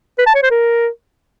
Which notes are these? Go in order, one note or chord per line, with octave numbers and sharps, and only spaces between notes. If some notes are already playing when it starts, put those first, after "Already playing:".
B4
A5
C#5
C5
A#4